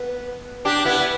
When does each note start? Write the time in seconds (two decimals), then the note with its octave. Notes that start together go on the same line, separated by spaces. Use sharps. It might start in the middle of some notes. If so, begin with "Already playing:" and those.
Already playing: B3
0.65 D4 G4
0.85 B3 E4